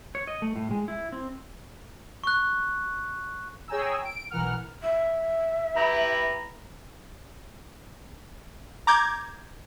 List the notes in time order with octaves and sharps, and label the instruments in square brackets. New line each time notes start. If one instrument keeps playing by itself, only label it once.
[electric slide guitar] C#5
D#5
A3
A2
G#3
E4
C4
[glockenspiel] C#6 F#6
[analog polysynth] G#4 C#5 G5 G#5 A#5 E6
D7
B1 E3 A#4 F#5 F6
[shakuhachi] E5
[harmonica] E4 G4 B4 [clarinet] A#5
[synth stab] A#5 D6 G6 G#6